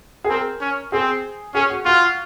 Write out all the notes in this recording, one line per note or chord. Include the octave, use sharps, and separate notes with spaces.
G#4
C4 A#4
C#4
C4 G#4
C#4 G#4
F#4
F4 F#4